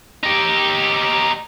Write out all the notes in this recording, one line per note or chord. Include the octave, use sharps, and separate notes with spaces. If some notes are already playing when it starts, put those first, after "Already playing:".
D#4 G4